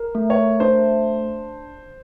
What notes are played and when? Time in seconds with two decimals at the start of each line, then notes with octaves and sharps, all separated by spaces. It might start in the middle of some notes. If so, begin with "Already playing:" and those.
Already playing: A#4
0.15 A3
0.30 C#5
0.60 D4 C5